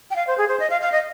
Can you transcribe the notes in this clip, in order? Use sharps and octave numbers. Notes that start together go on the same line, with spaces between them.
G5
F5
C5
G#4
C5
D#5
F5
F5
D#5